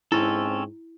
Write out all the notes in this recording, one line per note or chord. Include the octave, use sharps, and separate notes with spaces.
G#2 C4 C#4 E4 A4